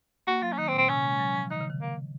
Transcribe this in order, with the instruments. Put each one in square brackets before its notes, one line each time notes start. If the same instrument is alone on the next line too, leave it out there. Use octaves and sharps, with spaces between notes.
[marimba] A#3 [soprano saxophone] F#4
[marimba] F#3 [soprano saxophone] F4
[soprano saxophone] C#4
[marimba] D#3 [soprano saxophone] D#4
[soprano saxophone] C4
[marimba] A#2
[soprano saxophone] C4
[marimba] C3 [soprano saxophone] C#4
[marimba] G#3
F#3
F3
[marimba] D#3 [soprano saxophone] D#4
[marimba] C#3
D#3
[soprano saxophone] A#3